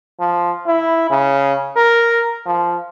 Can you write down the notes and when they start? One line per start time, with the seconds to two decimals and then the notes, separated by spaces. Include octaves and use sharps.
0.20 F3
0.67 E4
1.10 C#3
1.76 A#4
2.46 F3